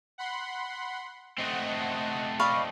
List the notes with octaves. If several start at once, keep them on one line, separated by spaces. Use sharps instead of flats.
F#5 B5 C6
A3 C4 D#5 F#5
D5 D#5 F5 B5 C#6